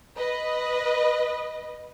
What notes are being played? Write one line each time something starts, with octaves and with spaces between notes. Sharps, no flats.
B4 D#5